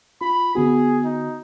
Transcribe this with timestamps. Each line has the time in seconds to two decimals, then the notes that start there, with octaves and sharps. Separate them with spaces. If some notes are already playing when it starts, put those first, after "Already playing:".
0.21 F4 B5
0.55 D3 B3 F#4 G#4
1.05 D#4